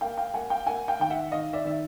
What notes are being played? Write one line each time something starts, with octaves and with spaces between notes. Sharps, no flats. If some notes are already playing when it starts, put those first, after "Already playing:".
A#3 F5 G5
F5 G5
A#3 F#5 G#5
F5 G5
A#3 F#5 G#5
F5 G5
D#3 G5
E5 F#5
D#3 D#5 F5
D5 E5
D#3 E5